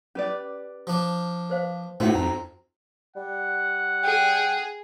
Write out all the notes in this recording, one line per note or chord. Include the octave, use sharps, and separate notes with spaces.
C#4 G4 B4 D5
F3 D4
B4 C5 F5
A2 C4 C#4 D#4 F#4 B4 F#5
F2 A#5
G3 F#5
G#4 G5